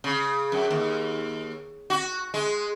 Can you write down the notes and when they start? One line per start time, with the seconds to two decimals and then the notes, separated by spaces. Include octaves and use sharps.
0.04 C#3
0.52 F#2
0.71 D#2
1.90 F#4
2.34 G#3